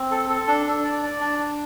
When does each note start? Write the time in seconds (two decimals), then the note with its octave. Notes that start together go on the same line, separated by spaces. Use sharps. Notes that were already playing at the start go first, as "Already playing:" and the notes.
Already playing: C4
0.11 A4
0.29 A4
0.47 D4
0.66 D4
0.85 D5
1.03 D5
1.21 D4
1.39 D4